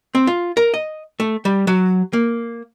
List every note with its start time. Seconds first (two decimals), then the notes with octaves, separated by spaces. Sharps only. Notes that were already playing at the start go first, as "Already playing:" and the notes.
0.15 C4
0.27 F4
0.57 A#4
0.74 D#5
1.20 A3
1.45 G3
1.67 F#3
2.13 A#3